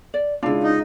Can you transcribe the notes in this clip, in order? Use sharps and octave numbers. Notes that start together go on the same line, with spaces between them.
D5
C#3 G#3 D4 E4 F4
D#4